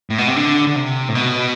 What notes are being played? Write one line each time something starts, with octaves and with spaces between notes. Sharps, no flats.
A2
B2
C3
D3
D3
C3
A2
B2